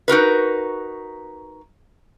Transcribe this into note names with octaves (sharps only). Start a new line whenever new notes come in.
D#4 F#4 A#4 B4